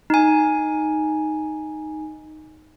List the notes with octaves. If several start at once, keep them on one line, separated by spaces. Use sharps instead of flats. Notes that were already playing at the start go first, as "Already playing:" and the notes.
D#4 G#5